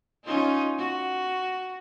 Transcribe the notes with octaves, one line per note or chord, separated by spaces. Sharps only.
C#4 D#4 F4
F#4